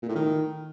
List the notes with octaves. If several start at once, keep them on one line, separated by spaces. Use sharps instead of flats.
A#2
A2
D#3